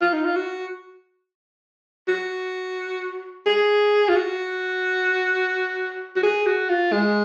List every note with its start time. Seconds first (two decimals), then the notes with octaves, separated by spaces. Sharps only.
0.01 F4
0.13 D#4
0.25 F4
0.36 F#4
2.08 F#4
3.46 G#4
4.09 F4
4.16 F#4
6.16 F#4
6.23 G#4
6.46 F#4
6.69 F4
6.92 G#3